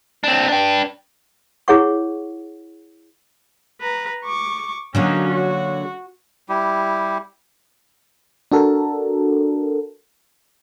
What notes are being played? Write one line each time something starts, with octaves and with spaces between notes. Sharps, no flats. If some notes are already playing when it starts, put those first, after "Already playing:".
C4 D4
D4 G5
E4 G#4 C#5 F#5 C#6
B4 A#5
C#6 D6
D3 F#3 A#3 C#4 D#4
F#4
G3 E4 G4
D4 F#4 A4 A#4